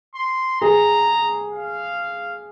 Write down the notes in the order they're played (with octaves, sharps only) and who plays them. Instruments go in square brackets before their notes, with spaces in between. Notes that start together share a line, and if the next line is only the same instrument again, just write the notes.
[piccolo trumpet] C6
[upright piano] G#4 [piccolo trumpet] A#5
[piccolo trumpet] F5